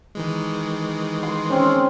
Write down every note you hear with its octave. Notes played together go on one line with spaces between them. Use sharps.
D#3 E3 G#3
C6
C4 C#4